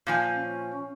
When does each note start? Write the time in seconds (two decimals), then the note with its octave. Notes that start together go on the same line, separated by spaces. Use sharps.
0.07 A#2 F3 G#5
0.35 C#4